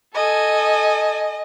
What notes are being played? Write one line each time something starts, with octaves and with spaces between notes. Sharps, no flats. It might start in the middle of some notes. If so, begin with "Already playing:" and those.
A4 D#5 G#5